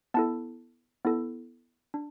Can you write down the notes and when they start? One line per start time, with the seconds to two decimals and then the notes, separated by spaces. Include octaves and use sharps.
0.14 B3 E4 A4 A5
1.05 B3 E4 A4
1.94 D4